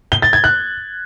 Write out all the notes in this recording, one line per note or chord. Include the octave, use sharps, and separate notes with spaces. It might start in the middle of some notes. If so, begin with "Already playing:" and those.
G7
A6
G#6
F#6